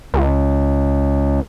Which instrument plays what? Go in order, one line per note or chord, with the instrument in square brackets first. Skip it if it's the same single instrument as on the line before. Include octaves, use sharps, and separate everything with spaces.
[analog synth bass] C#2